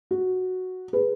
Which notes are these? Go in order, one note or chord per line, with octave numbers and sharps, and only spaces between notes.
F#4
G#4 B4